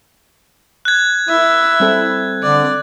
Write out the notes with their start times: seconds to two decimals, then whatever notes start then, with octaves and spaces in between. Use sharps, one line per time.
0.85 F#6 G#6
1.29 E4 E5
1.80 G3 C4 A4
2.43 D3 D5